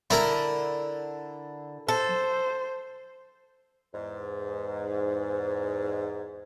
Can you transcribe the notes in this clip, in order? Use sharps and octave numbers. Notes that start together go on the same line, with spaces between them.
D3 E4 A#4 A5
A4 C5
E2 G#2